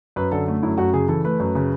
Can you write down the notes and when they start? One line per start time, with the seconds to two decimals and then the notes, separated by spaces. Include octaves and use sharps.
0.16 F#2 B4
0.32 D3 A4
0.48 A3
0.63 F#2 E4
0.78 F#2 F#4
0.93 C#3 G#4
1.08 E3 A4
1.24 A3 B4
1.40 F#2
1.55 C#3